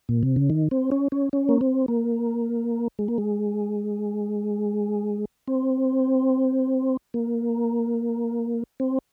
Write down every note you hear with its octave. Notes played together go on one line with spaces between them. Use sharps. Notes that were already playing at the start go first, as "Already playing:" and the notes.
A#2
C3
C#3
D#3
C4
C#4
C#4
C#4
A#3
C4
A#3
G#3
A#3
G#3
C4
A#3
C4